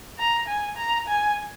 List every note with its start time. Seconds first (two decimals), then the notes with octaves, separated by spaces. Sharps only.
0.19 A#5
0.48 G#5
0.77 A#5
1.08 G#5